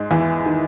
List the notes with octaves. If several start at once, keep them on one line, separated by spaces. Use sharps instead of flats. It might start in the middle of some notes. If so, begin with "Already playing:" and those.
Already playing: G#2 G#3
E2 E3
D#3